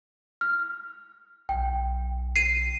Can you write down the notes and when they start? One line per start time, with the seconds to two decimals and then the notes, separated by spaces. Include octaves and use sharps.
0.41 F6
1.49 B1 G5
2.36 C7 D#7